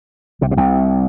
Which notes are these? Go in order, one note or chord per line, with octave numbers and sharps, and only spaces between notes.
C2 C3
B2
C2 C3